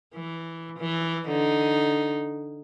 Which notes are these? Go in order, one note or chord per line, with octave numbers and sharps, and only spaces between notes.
E3
E3
D3 D#4